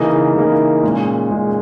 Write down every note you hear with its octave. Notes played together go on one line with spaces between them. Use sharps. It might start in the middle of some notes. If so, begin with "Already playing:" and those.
Already playing: C#3 E3 A#3 D#4
C#3 E3 A#3 D#4
A#2 G#3 C#4
A#2 G#3 C#4